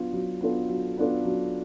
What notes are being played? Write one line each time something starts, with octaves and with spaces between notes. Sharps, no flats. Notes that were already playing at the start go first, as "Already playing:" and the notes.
Already playing: F#3 B3 D4 F4
F#3
B3 D4 F4 A4
F#3
B3 D4 F4 A4
F#3